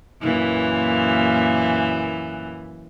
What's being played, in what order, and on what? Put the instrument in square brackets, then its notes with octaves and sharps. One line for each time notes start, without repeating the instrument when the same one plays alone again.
[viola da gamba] F#2 A#2 E3